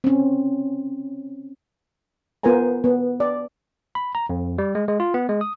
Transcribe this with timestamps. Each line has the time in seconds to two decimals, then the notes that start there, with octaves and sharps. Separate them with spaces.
0.04 C4 C#4
2.43 B3 F4 A#4 C5 G#5 A#5
2.84 B3
3.20 D5
3.95 B5
4.15 A#5
4.29 F2
4.58 G3
4.75 G#3
4.88 G#3
5.00 F4
5.14 B3
5.29 G#3
5.41 D#6